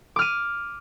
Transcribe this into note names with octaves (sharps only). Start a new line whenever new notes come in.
D6 F6 D#7